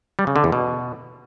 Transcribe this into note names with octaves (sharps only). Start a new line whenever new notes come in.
G3
C#3
D3
E2
B2